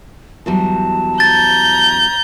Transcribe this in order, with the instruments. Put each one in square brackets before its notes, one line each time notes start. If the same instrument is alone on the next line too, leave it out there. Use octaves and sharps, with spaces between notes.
[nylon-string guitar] E2 F#3 G3 [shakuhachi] A5
[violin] A#5 G6 [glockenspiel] A6